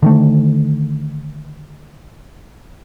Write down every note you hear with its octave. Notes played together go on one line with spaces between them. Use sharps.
D3 D#3 A3